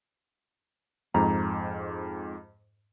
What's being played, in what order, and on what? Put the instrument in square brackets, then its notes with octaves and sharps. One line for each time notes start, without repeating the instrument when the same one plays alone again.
[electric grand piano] F2 G#2 [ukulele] A#5